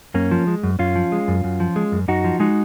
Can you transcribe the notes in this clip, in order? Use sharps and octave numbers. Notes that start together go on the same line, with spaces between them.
F#2 A#3 C#4
F3
G#3
F#2
F#2 C#4 F4
F3
G#3
F#2
F#2
F3
G#3
F#2
F#2 D#4 F#4
F3
G#3 D#4 F#4